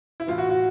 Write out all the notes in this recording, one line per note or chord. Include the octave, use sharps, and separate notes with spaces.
E4
A2 E3 F4
F#4
F#4